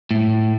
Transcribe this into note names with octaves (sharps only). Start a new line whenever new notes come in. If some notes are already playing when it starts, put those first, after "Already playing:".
A2